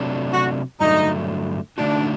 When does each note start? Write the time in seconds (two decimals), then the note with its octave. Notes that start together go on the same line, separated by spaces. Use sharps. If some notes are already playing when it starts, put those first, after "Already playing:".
Already playing: C3 F#3 A3 D4
0.32 F#4
0.80 G2 D3 F#3 A3 D#4
1.78 D3 A3 D4 D#4 F#4